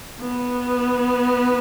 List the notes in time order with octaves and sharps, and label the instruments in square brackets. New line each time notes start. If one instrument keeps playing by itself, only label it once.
[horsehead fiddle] B3